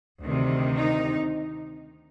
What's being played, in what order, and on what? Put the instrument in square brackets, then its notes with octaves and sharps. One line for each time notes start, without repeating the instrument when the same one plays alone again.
[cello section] D2 C3 D#3
D#4